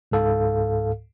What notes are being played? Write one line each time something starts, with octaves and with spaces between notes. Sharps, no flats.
C#2 G#2 A4 F5